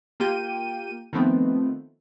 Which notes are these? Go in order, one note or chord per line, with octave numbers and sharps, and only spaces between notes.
A#3 F4 G4 G5 D#7
D#3 F3 A3 B3 C4